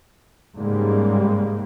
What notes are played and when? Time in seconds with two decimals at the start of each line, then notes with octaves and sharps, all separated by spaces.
0.57 G#2 C#3 G3 G#3 A#3